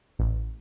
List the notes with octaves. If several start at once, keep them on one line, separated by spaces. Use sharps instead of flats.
A1